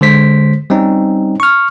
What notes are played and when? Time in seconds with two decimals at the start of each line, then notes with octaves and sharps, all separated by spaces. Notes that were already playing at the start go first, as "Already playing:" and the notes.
0.01 D3 G#3 C5 B6
0.70 G3 C4 C#4 D#4
1.40 C#6 F6